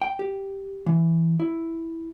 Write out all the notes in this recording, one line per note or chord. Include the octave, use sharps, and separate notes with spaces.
G5
G4
E3
E4